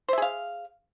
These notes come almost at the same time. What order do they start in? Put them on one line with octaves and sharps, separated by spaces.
C5 E5 G#4 F5